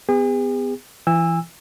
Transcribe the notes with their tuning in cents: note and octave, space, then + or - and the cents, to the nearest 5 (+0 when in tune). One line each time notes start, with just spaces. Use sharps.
B3 +25 G#4 -40
E3 +30 G#5 -30 E6 +0